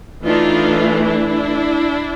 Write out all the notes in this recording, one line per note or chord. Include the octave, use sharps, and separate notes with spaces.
E3 A3 D4 D#4 F4
D4 E4